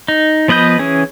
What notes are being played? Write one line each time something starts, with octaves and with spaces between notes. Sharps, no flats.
D#4
F3 B3 B4 D#5 G6
E3 C#4 G#4